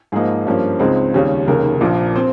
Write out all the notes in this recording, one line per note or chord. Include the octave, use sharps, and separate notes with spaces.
G#2 F3 A#3 D#4 G#4
G2 F3 A#3 C#4
C#2 C#3 G#3 C4 D#4
D#2 C#3 G3 C#4
F1 D#2 C#3 A#4
A#1 A#2 F3 A#3
C4 C5